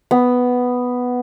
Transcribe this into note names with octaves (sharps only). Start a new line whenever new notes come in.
B3